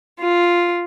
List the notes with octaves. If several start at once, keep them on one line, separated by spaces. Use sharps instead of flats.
F4